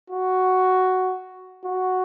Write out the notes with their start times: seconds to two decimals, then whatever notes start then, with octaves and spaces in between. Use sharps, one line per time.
0.10 F#4
1.65 F#4